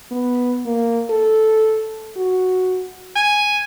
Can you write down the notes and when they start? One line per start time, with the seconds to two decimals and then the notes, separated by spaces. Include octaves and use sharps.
0.11 B3
0.66 A#3
1.10 A4
2.16 F#4
3.16 G#5